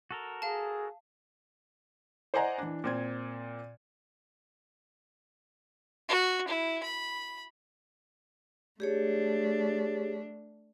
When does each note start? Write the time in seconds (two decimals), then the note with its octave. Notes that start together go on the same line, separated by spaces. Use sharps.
0.11 F#4 A4 A#4
0.42 G#4 F5 A5
2.34 C5 D5 D#5 F#5 G#5 A#5
2.58 E3 D4
2.84 A#2 C4 G#6
6.09 F#4
6.48 E4
6.83 B5
8.80 A3 D4 G4 G#4 C#5